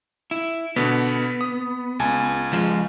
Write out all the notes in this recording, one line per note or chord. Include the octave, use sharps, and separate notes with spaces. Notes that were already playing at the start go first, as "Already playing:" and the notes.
E4
B2 D3 B3
D#6
C#2 G#5 A5
F3 G#3